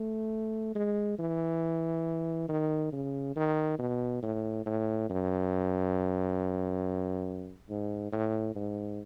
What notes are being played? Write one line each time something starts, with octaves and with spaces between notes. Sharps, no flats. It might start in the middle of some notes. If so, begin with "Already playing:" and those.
Already playing: A3
G#3
E3
D#3
C#3
D#3
B2
A2
A2
F#2
G#2
A2
G#2